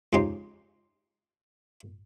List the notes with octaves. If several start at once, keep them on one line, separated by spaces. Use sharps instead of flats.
F2 C#3 G#3 D#4 G4 C6